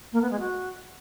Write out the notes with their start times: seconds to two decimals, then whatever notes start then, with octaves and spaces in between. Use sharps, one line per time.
0.12 A#3
0.21 B3
0.30 G#3
0.39 F#4